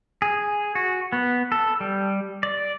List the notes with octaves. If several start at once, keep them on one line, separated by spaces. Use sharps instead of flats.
G#4
F#4
B3
A4
G3
D5